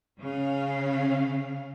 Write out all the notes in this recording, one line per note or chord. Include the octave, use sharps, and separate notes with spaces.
C#3 C#4 F5